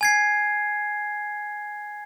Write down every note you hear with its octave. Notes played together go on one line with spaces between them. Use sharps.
G#5 G#6 C7